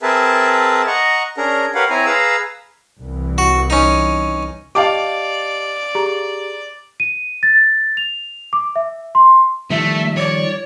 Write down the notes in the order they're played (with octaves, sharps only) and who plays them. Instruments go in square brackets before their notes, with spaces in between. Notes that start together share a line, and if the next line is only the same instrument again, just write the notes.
[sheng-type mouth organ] C4 G#4 A#4 B4 E5 A5
D#5 F#5 A#5 C#6
C#4 D4 G#4 A#4 A#5
G4 A#4 B4 C#5 F5 F#5
C4 E4 C#5 G#5 A#5
G#4 B4 F5 A#5 E6
[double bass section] C2 E3
[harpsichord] F#4
C#4 D#4
[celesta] G4 D#5 A5 [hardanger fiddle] D5 [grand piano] F5 G5 D6
[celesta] G4 G#4 A#5
D#7
A6
F7
D6
E5
C6
[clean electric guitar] D#3 F3 G3 [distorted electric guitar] A3 [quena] E5
[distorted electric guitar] C#5 [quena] D5